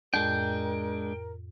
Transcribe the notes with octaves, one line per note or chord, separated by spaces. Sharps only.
F2 A2 G#3 D4 A#4 G5